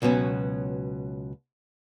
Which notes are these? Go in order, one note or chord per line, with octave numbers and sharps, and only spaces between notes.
C#2 B2 F#3 B3 C#4